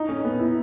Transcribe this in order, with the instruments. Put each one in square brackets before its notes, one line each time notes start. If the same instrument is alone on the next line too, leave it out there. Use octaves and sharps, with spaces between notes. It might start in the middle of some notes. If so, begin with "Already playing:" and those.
Already playing: [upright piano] D#4
C#4
B3
E4